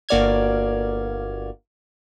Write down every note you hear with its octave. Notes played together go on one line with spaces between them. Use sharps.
G1 A#3 F#4 D5 F6 G#6